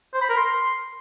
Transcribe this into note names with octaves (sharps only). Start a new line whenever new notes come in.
C5
B5
A#4
C6